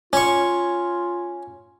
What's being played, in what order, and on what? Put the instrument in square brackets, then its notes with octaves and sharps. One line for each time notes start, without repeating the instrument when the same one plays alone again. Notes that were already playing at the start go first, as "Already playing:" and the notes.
[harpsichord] C#4 C#6 [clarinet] F4